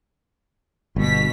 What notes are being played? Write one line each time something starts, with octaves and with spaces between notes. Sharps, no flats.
G1 B2 B6